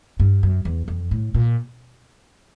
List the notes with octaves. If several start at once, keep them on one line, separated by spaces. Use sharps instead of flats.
G2
F#2
E2
F2
A2
A#2